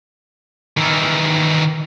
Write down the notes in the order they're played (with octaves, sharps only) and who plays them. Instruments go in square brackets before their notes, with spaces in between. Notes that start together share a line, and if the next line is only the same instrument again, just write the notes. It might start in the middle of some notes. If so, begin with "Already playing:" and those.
[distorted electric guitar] D#3 E3